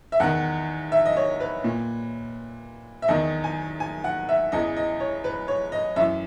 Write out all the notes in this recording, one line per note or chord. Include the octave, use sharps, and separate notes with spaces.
E5
E2 D#3 F#5
E5
D#5
C#5
B4
A#2
E5
E2 D#3 D#5
G#5
G#5
F#5
E5
E2 C#3 E3 D#5
D#5
C#5
B4
C#5
D#5
F#2 E3 E5